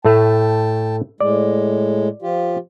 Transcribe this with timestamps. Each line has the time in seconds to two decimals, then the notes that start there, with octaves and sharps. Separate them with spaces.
0.05 A2 A3 G5 A5
1.20 A2 G#3 D5
2.22 F3 F4 G4